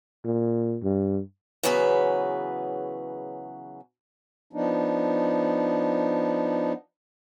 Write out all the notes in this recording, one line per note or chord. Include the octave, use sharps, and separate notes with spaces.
A#2
G2
C#3 E3 F#3 B3 G#4 B4
F3 B3 D4 D#4